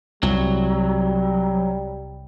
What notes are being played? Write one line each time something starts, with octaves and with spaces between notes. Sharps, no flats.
C2 F#3 G3